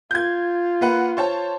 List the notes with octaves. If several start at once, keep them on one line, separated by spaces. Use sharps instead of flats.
F4 G6 G#6
A#3 B4 F#5
C5 C#5 A5